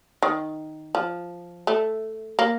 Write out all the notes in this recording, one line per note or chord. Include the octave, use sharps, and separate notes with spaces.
D#3
F3
A3
A#3